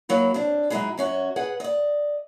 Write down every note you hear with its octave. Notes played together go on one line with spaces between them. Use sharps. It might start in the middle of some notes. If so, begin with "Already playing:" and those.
F#3 A#3 E4
C4 D4
F#3 G#3 A3 D#4 E4 G#4
F#2 C#4 F#4
G#4 B4 F#5
D5 D#5